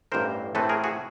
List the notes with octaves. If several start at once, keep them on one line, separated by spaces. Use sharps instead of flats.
A1 G2 E3 A#4 C5
A2 E3 A3 C4 A4 B4
G#4 A#4
F#4 G#4